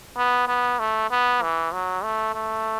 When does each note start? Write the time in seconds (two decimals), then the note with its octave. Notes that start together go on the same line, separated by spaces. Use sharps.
0.17 B3
0.48 B3
0.79 A3
1.11 B3
1.42 E3
1.72 F#3
2.03 A3
2.35 A3